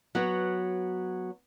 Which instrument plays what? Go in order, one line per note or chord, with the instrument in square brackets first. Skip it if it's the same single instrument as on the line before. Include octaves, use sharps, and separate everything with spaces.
[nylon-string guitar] F#3 B3 F#4 C#5